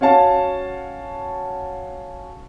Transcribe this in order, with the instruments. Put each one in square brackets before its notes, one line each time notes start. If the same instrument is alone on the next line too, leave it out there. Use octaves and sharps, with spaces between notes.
[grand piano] C#4 F#4 F5 A5